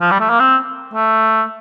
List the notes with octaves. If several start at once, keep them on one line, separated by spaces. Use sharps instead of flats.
F3
G3
A3
A#3
C4
A3